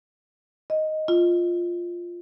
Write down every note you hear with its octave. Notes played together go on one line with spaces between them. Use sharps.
D#5
F4